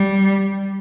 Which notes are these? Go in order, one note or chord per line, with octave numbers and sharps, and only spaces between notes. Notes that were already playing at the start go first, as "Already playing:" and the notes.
Already playing: G3